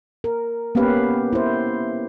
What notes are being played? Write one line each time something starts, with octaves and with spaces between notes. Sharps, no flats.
A#4
A#3 B3 C#4 G4 B4 F5
E4 C5